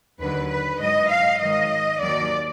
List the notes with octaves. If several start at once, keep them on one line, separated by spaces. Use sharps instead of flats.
D#2 D3 F#3 B4
B4
G#2 F#3 D#5
F5
G#2 D#3 F#3 D#5
D#2 D#3 F#3 D5